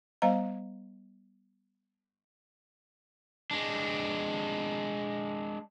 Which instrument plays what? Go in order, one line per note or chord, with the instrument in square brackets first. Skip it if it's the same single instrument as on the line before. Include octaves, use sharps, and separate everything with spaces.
[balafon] G3 B3 C5 D#5 F5 A#5
[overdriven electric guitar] G#3 D4